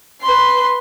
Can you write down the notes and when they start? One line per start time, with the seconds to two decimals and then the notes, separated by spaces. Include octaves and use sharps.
0.22 B4 C6